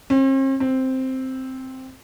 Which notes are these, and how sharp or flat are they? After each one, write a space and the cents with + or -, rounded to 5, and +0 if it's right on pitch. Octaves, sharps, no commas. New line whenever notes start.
C4 +45
C4 +0